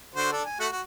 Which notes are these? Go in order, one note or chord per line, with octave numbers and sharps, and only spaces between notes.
D3 F#4 C5
D4 A4
G#5
A3 F#4 F#5
F#4